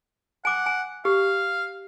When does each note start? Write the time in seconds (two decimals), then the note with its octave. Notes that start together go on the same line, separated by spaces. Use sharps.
0.45 F#5 G#5 D6
0.66 G#5
1.05 G4 F5